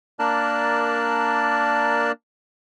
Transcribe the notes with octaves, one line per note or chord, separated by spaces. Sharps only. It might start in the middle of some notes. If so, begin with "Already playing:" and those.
A#3 D4 A#4 D5 A5 F#6